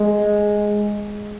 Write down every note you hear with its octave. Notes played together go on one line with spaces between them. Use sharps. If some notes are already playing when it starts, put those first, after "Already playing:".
Already playing: G#3